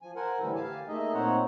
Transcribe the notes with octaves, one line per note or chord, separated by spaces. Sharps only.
F3 G#5
A#4 C5 F#5 G#5
A2 D3 E3 G3 E4 A4
G4 F5 G#5 A5
A3 A#3 D#4 G#4 D#5 E5
A#2 C4 D#4 C5 C#5 F#5